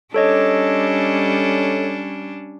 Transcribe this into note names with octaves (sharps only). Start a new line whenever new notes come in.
G3 C#4 D4 A4 C#5 D#5